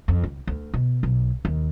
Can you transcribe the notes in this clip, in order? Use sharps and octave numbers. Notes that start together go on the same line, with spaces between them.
F2
C#2
D2
B2
B1
D#2